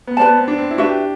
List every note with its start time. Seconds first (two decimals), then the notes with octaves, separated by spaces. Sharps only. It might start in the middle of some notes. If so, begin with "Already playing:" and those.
0.07 B3
0.17 C4 B4 D5 A5
0.27 B3
0.37 C4
0.48 D4
0.58 C4
0.71 E4
0.78 D4 F#4 B4 E5
0.88 G4